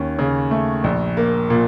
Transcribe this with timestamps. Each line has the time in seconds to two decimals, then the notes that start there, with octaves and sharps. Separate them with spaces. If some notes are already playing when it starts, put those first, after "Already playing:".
Already playing: D#2 C#4
0.19 C#3
0.51 A3
0.84 A#1
1.17 A#3
1.50 A#2